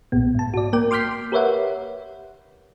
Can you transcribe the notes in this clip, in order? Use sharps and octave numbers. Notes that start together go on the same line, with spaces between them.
B1 A#2 B3
G#2 A5
F#4 D5
A#3 A#4 G5 D6
C6 D6 F6 G6 B6 C7
G4 A#4 B4 C#5 E5 F#5